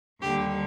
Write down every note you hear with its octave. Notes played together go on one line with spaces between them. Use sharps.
D#2 D3 G3 G4